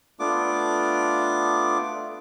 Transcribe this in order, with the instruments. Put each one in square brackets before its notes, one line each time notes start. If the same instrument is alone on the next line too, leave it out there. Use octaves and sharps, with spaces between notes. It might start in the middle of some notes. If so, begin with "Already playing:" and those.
[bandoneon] A3 B3 D4 F4 D6